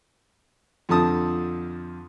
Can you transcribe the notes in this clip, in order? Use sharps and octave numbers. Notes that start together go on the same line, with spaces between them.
F2 D3 F3 A5 D#6